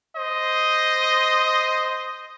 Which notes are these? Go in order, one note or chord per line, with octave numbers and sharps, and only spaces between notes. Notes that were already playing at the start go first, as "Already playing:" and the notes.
C5 D#5